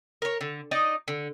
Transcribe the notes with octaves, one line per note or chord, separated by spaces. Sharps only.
A#4 C#5
D3
D#4 D5 D#5
D3